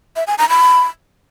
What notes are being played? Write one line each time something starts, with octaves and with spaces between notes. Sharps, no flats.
E5
G#5
A#5
B5